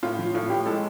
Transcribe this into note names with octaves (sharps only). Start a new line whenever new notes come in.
A2 F4
F3
A2 F4
A2 G4
G#3 A4